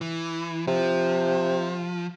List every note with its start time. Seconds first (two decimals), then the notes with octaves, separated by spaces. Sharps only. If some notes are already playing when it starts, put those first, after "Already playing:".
0.01 E3
0.67 C3 F3